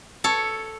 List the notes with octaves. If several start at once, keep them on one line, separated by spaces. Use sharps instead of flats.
A4 C#5